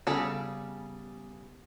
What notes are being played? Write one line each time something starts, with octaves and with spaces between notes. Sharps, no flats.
C#3 G3 B3 G#4 A4 D5